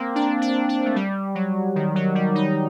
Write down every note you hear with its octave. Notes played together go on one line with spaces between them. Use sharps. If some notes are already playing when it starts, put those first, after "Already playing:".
Already playing: A#3 C4
D4
D4
D4
A3
G3
F#3
D#3
F#3
G3
D#4